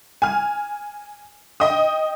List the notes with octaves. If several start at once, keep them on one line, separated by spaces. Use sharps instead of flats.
G#5 F6
D#5 G5 D#6